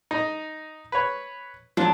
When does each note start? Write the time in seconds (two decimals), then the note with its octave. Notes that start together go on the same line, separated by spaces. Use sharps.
0.11 D#4 D#5
0.92 B4 C#5
1.77 F3 F#3 D4